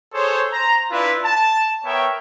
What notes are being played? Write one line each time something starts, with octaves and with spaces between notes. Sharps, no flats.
G#4 A4 C5 C#5
C5 A#5
D4 E4 F4 B4 E5
A5
B3 A#4 C#5 E5 G5